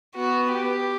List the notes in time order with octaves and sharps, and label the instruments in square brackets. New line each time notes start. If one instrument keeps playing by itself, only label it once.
[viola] B3 [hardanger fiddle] F#4
[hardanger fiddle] G4